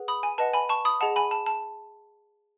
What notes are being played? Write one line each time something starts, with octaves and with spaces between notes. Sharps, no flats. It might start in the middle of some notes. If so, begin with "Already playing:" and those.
Already playing: G#4 B4 F#5
B5 D#6
G#5
B4 D#5 F#5 A5
G#5 B5
A5 C#6
B5 D#6
G#4 D#5 F#5 A5
G#5 B5
A5
A5